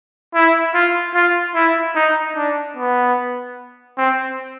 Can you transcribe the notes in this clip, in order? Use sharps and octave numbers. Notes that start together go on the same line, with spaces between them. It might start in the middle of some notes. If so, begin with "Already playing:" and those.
E4
F4
F4
E4
D#4
D4
B3
C4